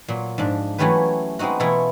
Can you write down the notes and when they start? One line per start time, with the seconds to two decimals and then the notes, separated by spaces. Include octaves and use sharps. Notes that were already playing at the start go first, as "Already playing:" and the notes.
0.08 A#2 F#3
0.38 G#2 F3 D4
0.78 E3 F#3 A3 C#4 G4 B4
1.39 G#3 B3 C4 D#4 F#4
1.60 B2 E3 A3 E4 F4 C#5